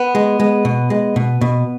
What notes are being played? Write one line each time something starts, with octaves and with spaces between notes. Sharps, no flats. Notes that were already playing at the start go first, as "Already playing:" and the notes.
Already playing: B3
G#3
G#3
B2
G#3
B2
B2